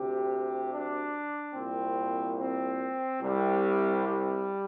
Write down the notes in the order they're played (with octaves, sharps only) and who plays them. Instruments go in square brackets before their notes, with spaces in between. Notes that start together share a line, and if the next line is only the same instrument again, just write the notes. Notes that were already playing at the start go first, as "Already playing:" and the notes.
Already playing: [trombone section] D2 C3 G4
D4
C2 A#2 C4
C4
C2 C3 G3
G3